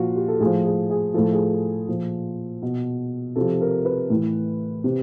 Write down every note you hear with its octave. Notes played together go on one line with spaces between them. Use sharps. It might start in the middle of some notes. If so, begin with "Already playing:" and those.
Already playing: A#2 F3 F4 F#4
G4
A4
A2 F3 G#4
G#4
G#4
A2 F3 A4
G#4
A4
A#2 F3
B2
C3 F3 A4
A#4
B4
A2 E3
C3